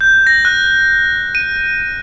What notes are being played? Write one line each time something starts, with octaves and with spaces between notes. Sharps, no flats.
G6
A#6
F#6
D#7